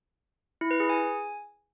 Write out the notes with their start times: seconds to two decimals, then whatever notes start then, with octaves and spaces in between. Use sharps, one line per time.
0.61 E4
0.71 B4
0.80 G#4
0.89 G#5